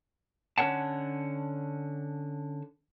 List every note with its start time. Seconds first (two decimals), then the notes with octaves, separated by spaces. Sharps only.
0.58 D3 C#4 A#4 C#5 F#5 A5